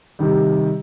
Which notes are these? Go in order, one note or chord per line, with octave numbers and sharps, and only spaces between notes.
C3 D#3 G3